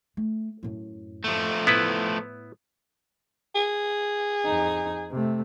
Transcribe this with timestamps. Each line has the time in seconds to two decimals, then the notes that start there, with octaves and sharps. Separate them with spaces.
0.17 A3
0.63 F#2 A2
1.24 F3 A3
1.67 A2 B3 E4 B4
3.55 G#4
4.45 F2 D#4
5.11 C3 A3